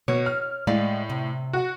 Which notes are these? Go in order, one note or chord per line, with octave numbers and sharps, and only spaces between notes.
B2 C#5
F6
A2 G#3 D5 F5
C3
F#4